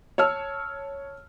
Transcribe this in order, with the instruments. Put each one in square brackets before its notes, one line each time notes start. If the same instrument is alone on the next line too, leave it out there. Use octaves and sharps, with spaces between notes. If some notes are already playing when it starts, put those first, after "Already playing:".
[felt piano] C#5 A5 E6 F6